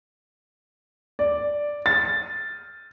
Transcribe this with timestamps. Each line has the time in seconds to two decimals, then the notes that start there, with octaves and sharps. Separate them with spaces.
1.19 D5
1.86 A6